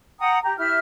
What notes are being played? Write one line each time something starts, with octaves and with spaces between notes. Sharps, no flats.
F#5 G5 A#5 D#6
G4 A#5
E4 G4 E5 F6